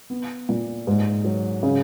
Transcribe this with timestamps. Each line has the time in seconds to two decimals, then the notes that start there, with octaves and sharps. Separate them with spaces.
0.10 B3
0.49 A#2
0.87 G#2
1.24 F#3
1.63 C#3